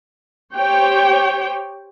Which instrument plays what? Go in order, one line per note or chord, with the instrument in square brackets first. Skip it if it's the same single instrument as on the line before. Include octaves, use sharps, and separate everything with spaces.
[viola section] G4 C5 C#5 G5